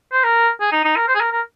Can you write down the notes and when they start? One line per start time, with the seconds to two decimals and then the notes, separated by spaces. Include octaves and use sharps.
0.12 C5
0.24 A#4
0.61 G#4
0.72 D#4
0.85 D#4
0.96 A#4
1.08 C5
1.15 G#4
1.21 A#4
1.32 A#4